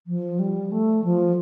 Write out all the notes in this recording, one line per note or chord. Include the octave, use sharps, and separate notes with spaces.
F3
G3
A3
F3